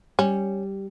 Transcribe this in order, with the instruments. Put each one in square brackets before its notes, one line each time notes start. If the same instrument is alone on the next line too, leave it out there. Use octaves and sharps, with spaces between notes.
[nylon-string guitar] G3 [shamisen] C#4